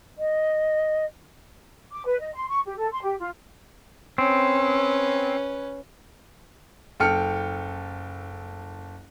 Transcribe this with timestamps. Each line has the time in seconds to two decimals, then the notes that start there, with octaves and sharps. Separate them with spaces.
0.18 D#5
1.90 D6
2.05 B4
2.19 D#5
2.34 C6
2.48 C#6
2.65 G4
2.77 A4
2.92 C6
3.04 G4
3.19 F4
4.18 C4 C#4 B4
7.00 F#1 A4 G5 F6 C#7